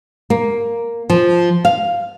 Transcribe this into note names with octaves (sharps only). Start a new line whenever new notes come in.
A#3
F3
F5